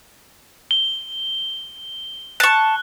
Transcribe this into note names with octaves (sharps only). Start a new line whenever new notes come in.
G7
A5 C#6 F#6